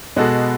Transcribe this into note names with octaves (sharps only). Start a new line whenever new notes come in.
B2 G#3 B3 F#4 A4